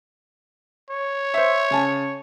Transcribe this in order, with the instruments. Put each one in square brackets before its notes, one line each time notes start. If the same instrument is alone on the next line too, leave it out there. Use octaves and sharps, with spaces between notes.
[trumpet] C#5
[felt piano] C5 E5
C#3 G#5 A5